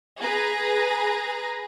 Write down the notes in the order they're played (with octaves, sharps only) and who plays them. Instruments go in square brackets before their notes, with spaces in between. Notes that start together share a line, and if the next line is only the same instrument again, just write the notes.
[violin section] G#4 B4 A#5 A#6